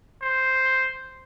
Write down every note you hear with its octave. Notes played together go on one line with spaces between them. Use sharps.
C5